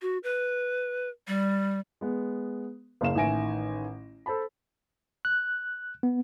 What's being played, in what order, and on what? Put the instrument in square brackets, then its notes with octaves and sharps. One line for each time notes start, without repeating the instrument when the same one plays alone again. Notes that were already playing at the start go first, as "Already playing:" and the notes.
[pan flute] F#4
B4
G3
[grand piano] G#3 B3
F#1 C#3 F5 E7
A1 D#3 E5 G#5 A#6 D7
A4 C5 A5 B5
[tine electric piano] F#6
B3